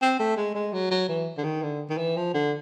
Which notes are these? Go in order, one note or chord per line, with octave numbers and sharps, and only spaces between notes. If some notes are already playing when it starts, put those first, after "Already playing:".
C4
A3
G#3
G#3
F#3
F#3
E3
D3
D#3
D3
D#3
E3
F3
D3